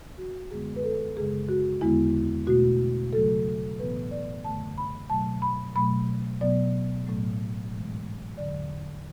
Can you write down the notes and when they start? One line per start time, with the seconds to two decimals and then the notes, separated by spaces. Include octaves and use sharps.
0.18 F#4
0.51 F#2 D3 G#3 B3 G#4
0.76 B4
0.83 A4
1.16 F#2 C#3 G#3 G#4
1.49 F#4
1.81 E2 D3 G#3 B3 E4
2.47 B2 A3 F#4
3.13 C#3 F#3 A3 A4
3.79 A2 E3 B3 B4
4.11 D5
4.44 F#2 D3 A3 A5
4.78 B5
5.10 B2 F#3 A3 A5
5.42 B5
5.76 B2 F#3 A3 B5
6.41 B2 F#3 B3 D5
7.07 A2 F#3 A3
7.72 G#2 E3 G#3 B3
8.37 E2 D3 F#3 D5